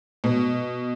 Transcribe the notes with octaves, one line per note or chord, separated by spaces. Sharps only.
B2